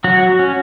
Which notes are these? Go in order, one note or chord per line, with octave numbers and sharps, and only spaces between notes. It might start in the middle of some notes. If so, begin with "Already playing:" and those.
F#3 F#4
C#4